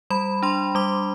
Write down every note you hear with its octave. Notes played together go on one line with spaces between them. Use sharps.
G3 B5
D4 C6
G3 D6